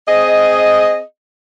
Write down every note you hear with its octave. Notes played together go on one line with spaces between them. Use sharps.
C4 G#4 D#5